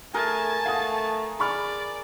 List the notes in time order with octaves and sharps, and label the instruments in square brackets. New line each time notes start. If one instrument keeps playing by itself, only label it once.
[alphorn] A3 [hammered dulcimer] G#4 A#4 [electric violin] G#5 A5
[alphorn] A3 [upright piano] F5 F#5 D#6
[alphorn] G#4 [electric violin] D5 [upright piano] B5 C#6 F6